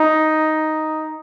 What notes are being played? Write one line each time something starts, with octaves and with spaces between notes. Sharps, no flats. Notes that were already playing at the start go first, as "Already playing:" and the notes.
Already playing: D#4